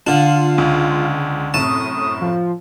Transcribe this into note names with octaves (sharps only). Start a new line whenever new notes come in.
D3 D4 F4
C#2
F#2 A2 C3 A5 D#6
F3